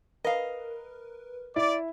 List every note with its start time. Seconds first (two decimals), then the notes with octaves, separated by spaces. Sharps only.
0.24 A#4 B4 D#5 F5
1.56 E4 D5